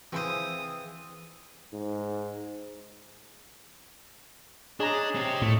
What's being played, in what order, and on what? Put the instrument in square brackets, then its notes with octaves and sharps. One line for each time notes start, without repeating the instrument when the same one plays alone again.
[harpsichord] E3 C5 [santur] C4 G#4 F5 [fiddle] D#6
[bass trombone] G#2
[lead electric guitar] D4 [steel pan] G#4 A#5 [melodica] C#5 D#5
[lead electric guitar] C4 G4
[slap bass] A2 [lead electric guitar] A3